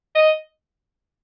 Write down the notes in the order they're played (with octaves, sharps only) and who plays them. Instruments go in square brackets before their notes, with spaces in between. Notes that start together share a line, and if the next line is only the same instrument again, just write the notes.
[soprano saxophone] D#5